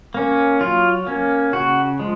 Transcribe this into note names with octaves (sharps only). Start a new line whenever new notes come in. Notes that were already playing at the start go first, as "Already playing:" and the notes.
A#3 C#4
F#3 F4
A#3 C#4
C#3 F#4
F3 G#3